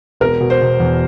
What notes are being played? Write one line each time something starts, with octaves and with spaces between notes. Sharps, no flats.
E1 A#4
B2
C5
B2
E2